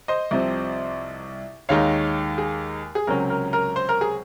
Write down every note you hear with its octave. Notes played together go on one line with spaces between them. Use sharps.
C5 D#5
C2 C3 F3
D#2 D#3 G#3 D#4 C#5 F5
G#4
G#4
C#2 C3 F#3 C#4 A#4
A#4
A#4
C5
A#4
G#4